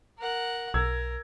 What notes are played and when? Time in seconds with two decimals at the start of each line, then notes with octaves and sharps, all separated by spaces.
0.19 A#4 F#5
0.74 B1 A#4 E6 G#6